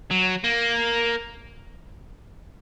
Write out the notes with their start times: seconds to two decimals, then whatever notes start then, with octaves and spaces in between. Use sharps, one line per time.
0.11 F#3
0.44 A#3